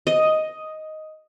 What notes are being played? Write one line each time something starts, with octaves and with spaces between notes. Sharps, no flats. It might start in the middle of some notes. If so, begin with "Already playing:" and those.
D#5